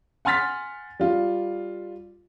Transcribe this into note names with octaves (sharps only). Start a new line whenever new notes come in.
F#5 G#5 C6 F6 A6 B6
G3 F4